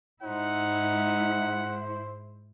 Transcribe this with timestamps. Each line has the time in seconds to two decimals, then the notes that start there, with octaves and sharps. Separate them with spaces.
0.23 G#2 D#4 E4 C5 F#5